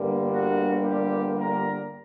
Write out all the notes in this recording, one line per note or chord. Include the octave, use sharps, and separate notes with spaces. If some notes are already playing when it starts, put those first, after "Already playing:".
Already playing: G1 G2 D3 G3 A#3
F#4
G4
A#4